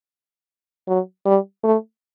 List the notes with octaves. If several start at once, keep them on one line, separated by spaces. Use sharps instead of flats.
F#3
G3
A3